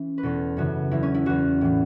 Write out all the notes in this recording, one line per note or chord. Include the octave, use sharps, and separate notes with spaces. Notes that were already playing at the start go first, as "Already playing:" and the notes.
Already playing: E3 C#4 E4
B4
E2 B2 A4
F#2 C#3 E3 F#4
E2 E3 E4
C#4
E4
E2 E3 F#4
A2 E3